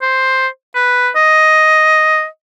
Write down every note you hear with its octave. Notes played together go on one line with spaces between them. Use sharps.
C5
B4
D#5